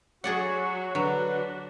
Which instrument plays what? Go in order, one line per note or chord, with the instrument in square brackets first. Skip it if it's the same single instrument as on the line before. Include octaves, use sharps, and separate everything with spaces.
[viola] F#3 [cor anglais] F#4 [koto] G#4 D5 F#5 [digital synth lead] C#5
[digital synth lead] D3 [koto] F#3 [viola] D4 F#4 [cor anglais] B4